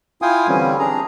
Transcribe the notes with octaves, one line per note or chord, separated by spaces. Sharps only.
E4 F4 F5 G5 G#5 D#6
D3 E3 G3 C4 C#4
D4 G#4 A#5